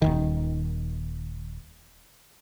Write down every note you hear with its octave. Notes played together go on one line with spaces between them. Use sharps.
D#1 G#1 D#3